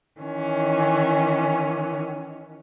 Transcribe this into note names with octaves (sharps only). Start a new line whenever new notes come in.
D#3 E3 C#4